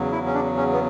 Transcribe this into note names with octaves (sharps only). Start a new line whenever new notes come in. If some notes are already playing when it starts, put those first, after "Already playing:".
Already playing: E2 C#3 F#3
E4
C#4
D4
C#4
B3